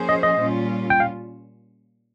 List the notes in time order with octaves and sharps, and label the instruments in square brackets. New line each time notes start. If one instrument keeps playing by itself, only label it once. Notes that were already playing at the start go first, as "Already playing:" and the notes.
Already playing: [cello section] F3 A#3 C#4 G#4 C5
[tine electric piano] D#5
D#5
[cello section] A#2 G3 C#4 F4
[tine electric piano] G5
F5